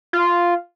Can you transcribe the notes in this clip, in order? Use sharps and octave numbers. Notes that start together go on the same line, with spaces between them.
F4